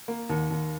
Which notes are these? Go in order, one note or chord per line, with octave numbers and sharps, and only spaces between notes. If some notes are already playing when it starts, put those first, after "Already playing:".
A#3
D#2
D#2